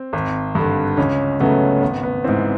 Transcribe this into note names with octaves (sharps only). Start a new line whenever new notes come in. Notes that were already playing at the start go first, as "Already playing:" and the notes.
Already playing: C4
G#1
G2 D3
C#2 C#4
C#3 F#3 A3 B3
G#1 B3
B3
G#2 E3 C4